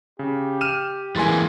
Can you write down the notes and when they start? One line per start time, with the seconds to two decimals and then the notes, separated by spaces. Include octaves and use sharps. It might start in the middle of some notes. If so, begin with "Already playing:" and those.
0.19 C#3 G4
0.61 F6 D#7 E7
1.16 E3 G#3 A#3 G#5 C6 A6